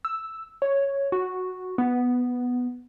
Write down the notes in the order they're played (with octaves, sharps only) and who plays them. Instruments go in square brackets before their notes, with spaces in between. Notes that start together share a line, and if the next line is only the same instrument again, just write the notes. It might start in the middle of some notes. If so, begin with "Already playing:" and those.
[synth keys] E6
C#5
F#4
B3